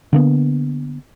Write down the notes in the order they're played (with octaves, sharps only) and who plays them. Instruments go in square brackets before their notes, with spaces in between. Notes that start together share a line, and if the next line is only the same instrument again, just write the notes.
[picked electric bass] D3 A#3 B3